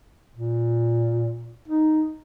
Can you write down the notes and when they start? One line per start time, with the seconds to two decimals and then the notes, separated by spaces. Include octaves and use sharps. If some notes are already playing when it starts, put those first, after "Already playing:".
0.36 A#2
1.68 D#4